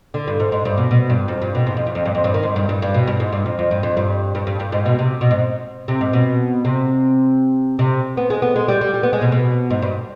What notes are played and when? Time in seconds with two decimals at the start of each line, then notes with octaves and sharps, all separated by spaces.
0.14 D3
0.27 G2
0.40 G#2
0.52 G#2
0.65 G2
0.78 B2
0.91 B2
1.10 G2
1.28 F2
1.42 G2
1.55 B2
1.67 G#2
1.77 F2
1.87 G2
1.95 F2
2.05 G2
2.15 F2
2.24 G2
2.34 D#3
2.43 G#2
2.56 G2
2.69 G2
2.82 G2
2.94 B2
3.07 G2
3.20 G#2
3.32 G2
3.46 F2
3.59 F2
3.71 G2
3.83 F2
3.97 G2
4.35 G2
4.47 G2
4.60 G2
4.72 G#2
4.86 B2
4.99 C3
5.21 B2
5.31 G#2
5.88 C3
6.01 G#2
6.13 B2
6.65 C3
7.79 C3
8.17 B3
8.30 G#3
8.42 B3
8.56 G#3
8.68 G3
8.81 G3
8.94 G3
9.03 B3
9.13 G#3
9.22 B2
9.32 B2
9.70 G#2
9.82 G2